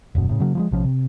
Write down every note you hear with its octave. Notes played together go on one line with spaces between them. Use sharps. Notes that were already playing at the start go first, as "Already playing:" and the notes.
D#1 F#2 B2
A2 C#3
C#3 F#3 A#3
F3 G3 G#3
A#1 C3 F3 C#4
C3